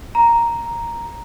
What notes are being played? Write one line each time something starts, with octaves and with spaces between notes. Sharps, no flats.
A#5